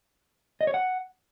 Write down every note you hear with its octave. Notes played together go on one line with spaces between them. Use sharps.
D#5
C#5
F#5